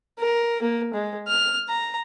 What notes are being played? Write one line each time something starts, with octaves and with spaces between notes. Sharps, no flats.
A#4
A#3
G#3
F6
A#5